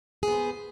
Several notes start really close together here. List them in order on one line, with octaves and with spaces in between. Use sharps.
G#4 B3 C5